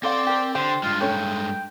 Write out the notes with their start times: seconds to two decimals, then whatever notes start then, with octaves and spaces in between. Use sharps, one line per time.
0.03 C4 A4 D5 F5 F#5 C6
0.27 G4 A#4
0.55 D3 G4 C5 G5
0.83 G2 G#3 F4
1.01 A3 C#4 A4 G5